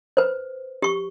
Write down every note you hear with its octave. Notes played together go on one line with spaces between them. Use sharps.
B4 C5
G4 C#6